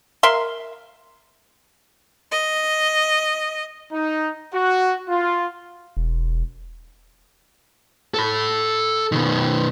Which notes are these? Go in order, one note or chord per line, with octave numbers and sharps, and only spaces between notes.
A#4 E5 F5 C6
D#5
D#4
F#4
F4
E1
A4 B5
B2 D#3